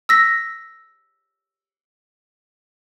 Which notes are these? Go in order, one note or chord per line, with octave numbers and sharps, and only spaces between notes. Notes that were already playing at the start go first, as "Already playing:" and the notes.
E6 A#6 B6